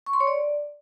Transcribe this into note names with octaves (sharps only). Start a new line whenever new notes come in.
C#6
C6
C#5
D5